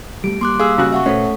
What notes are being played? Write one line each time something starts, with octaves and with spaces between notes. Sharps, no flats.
G3 A3 D7
G3 A#3 C6 D6 F#6
G#4 F5 E6
C#3 F#4 F#6
E5 F#5 C#6
A#2 A3 C#4 A4 B4 C5